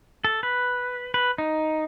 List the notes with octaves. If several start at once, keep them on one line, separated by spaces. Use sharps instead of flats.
A4
B4
B4
D#4